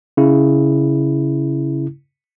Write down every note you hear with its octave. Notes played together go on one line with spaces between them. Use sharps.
C#3 E4